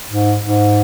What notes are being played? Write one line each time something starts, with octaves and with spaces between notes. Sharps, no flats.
G#2
G#2